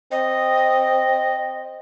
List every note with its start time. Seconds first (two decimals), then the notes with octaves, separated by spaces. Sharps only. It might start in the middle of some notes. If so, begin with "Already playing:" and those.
0.12 C4 D#5